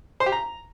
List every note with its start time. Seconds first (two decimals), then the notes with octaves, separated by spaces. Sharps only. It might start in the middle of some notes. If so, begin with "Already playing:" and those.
0.20 C5
0.26 G4
0.32 A#5